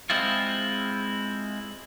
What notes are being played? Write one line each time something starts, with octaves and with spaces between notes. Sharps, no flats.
G#3 C4 E4 F4